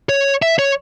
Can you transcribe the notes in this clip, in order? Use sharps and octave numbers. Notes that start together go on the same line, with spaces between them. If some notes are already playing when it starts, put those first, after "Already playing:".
C#5
E5
C#5